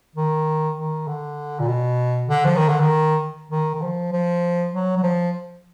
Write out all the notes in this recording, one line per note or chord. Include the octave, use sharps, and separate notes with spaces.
D#3
D#3
D3
A#2
B2
D3
F3
D#3
D3
D#3
D#3
D#3
F3
F3
F#3
F#3
F3